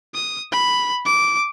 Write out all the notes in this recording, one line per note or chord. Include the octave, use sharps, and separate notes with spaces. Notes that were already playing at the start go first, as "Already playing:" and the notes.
D#6
B5
D6